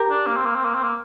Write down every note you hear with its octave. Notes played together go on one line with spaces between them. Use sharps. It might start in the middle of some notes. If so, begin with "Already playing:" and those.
Already playing: G4 A#4
D4
A#3
C4
A#3
C4
A#3
C4
A#3